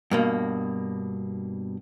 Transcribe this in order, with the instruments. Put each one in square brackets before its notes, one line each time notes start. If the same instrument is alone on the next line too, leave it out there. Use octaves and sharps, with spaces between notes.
[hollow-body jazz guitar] G2 B2 A#3